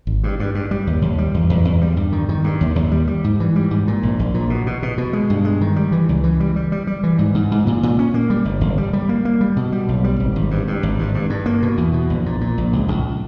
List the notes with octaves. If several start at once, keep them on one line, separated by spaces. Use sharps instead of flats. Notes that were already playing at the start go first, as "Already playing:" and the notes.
G#1
G2
G2
G2
G3
D#2
D#2
G3
E2
E2
E2
G3
G2
D#3
D#3
G2
D#2
D#2
G3
G3
G#2
E3
G3
G#2
A#2
A#1
A#1
A#2
B2
B2
B2
B2
G#3
G2
G#3
D#3
G3
E3
C#2
E3
G3
G3
G3
G3
E3
G#2
G#2
G#2
A#2
A#2
C#4
A#3
G3
G1
G1
G3
G3
A#3
A#3
G3
B2
G3
B1
G3
G#1
G#1
G2
G2
G#1
G2
G2
G2
A#3
B2
E2
B2
A#1
A#2
A#2
A#1
C#2
C#2